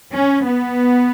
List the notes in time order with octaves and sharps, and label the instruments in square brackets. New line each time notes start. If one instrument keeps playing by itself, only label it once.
[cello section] C#4
B3